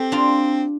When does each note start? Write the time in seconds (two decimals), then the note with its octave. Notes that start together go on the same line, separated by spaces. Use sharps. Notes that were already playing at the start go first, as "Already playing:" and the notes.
Already playing: C4 G4 A4
0.12 D4 F4